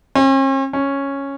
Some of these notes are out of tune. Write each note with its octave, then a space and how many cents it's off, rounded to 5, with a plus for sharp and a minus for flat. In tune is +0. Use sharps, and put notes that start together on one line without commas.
C#4 -45
C#4 -5